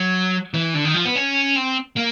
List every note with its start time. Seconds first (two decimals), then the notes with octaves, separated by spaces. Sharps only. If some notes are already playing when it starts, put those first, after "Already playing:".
Already playing: F#3
0.54 E3
0.75 D3
0.85 D#3
0.94 F3
1.05 B3
1.16 C#4
1.56 C4
1.96 A#3